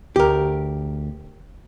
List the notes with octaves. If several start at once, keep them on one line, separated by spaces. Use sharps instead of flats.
D2 G4 A#4